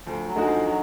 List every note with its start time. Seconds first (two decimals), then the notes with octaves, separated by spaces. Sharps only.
0.07 D2 F3
0.27 F#3
0.36 D3 G#3 D#4 F#4
0.46 F3
0.65 F#3